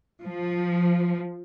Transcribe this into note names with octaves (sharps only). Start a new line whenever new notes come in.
F3